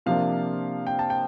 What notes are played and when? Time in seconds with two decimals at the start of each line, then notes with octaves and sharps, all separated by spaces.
0.06 C3 F3 A#3 D4 F5
0.87 G5
0.99 A5
1.10 G5